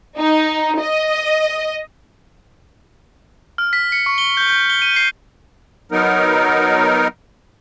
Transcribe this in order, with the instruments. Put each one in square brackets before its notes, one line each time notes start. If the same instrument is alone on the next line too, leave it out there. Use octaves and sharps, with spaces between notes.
[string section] D#4
D#5
[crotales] F6
B6
C#7
C#6
G7
G6
G6
G7
D#7
C7
[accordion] F#3 B3 D#4 A#4